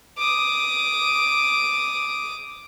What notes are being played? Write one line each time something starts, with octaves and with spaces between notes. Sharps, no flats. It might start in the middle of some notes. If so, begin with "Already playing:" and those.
D6 D#6